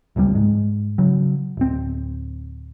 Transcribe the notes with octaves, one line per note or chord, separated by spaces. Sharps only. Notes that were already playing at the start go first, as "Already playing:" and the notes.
D#1 C#2 C3 G3
G#2 G#3
C#3 F#3
D1 C4